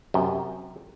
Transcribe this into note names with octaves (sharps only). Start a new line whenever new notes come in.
F#2 C3 G5